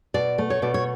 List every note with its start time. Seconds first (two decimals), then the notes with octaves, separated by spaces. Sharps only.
0.14 B2 D5
0.38 A3
0.50 C#5
0.62 B2 D5
0.74 C#5